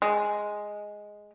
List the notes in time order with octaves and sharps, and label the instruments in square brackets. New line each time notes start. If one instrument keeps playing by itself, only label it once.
[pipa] G#3